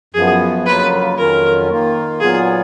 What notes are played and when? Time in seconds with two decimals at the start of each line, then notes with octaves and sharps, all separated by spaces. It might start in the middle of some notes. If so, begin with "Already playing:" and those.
0.14 F#2 F3 B3 G#4
0.66 F2 C#3 F#3 A#3 F4 B4
1.18 F2 D#3 F#3 C#4 F4 A#4
1.69 D#3 A#3 F4
2.20 A#2 F#3 B3 F4 G#4